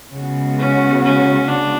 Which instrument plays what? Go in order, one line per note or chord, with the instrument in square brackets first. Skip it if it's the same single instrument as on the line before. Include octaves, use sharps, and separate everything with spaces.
[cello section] C#3 G#3 B3 F#4
[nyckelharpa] C#4
C#4
D4